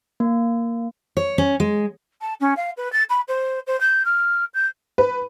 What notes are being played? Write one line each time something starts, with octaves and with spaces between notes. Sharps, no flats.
A#3
C#5
C#4
G#3
A5
C#4
F5
B4
A6
B5
C5
C5
G6
F6
G6
B4